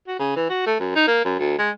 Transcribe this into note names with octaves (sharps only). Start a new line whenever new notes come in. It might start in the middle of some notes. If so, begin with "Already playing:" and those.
F#4
C#3
E3
F#4
A3
F#2
D#4
A#3
F#2
D2
G#3